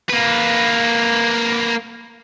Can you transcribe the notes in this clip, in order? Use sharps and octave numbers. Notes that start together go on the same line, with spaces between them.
A#3 B4